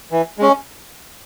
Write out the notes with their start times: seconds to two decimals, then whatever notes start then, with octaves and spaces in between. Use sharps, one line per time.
0.12 E3
0.38 G#3 C#4